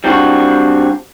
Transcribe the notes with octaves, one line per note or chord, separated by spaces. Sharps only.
G3 C4 D4 F4 F#4